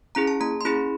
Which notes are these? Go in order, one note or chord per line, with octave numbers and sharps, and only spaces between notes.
C#4 E4 G#4 A#5
A5
A#3 A#5
C6
C#4 E4 G#4 B5